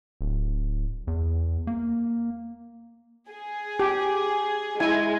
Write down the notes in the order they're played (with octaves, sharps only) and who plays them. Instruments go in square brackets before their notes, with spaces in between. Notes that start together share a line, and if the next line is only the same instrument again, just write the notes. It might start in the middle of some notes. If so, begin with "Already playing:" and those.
[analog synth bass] D1
E2
A#3
[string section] G#4
[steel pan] G4
[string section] G#3 [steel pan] E4 G#5